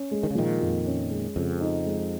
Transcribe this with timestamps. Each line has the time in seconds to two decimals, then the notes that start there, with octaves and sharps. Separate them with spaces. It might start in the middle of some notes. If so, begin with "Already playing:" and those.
Already playing: C#4
0.11 G#3
0.23 D#3
0.30 C#3
0.35 A#2 D#3 F3
0.61 F2
0.86 C#4
1.11 G#3
1.36 F2 C#3
1.61 D#4
1.86 G#3